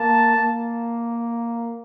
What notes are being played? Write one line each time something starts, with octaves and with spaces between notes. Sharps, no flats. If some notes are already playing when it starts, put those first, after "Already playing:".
Already playing: A#3 A5
A#3